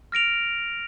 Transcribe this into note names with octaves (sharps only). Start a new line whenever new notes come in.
F6 A#6 D7 F7